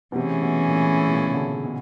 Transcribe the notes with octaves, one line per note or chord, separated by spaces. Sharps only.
B2
C3 E3 A3 C#4 E4 G#4
B2
A#2
B2
A#2
C#3
D3
C#3
B2